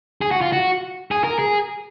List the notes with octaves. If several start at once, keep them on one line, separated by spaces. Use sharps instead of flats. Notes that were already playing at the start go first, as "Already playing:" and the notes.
G#4
F#4
F4
F#4
G#4
A#4
G#4